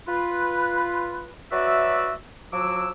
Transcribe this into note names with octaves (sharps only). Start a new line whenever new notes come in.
F4 B4
F#3 F#4 B4 D5 E5
F3 F#3 F#4 D6 E6